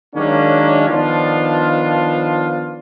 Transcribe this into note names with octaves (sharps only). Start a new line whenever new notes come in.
D#3 F#3 G#3 A#3 C#4 D4
D#3 F3 B3 D4 F4